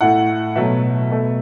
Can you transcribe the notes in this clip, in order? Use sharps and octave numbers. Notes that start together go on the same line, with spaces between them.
A2 A3 F#5
B2 F#3 A3 E5
B2 A3